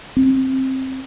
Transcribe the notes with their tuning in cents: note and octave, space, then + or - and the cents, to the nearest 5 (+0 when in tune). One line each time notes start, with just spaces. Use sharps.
C4 +15